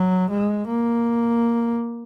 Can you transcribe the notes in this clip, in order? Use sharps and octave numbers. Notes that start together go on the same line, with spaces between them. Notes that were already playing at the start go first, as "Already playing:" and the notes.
Already playing: F#3
G#3
A#3